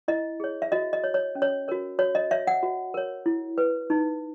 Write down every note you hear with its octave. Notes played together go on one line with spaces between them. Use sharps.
E4 D#5
G#4 C#5
E5
F#4 D#5
D#5
C#5
C#5
C#4
C#5
F#4 A#4 C#5
F#4 C#5
D#5
C#5 E5
F#5
F#4
A#4 C#5
E4
B4
D#4